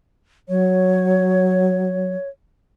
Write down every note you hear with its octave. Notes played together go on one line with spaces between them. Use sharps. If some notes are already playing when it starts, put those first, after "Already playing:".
F#3 C#5